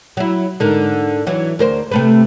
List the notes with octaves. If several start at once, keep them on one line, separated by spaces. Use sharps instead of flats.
F#3 E4
G#2 D3 A#4
E3 F#3
D2 A#4 C5
C3 A3 B4